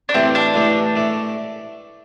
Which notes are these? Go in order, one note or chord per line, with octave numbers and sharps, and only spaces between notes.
D4
A2 E3 A3 C4 E4 G4
D4
A2 E3 A3 E4 G4
A2 A3 D4